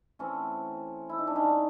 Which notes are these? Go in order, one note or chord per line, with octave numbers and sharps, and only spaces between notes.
E3 A3 C4 C#4
E4
D#4
D4
C#4 D#4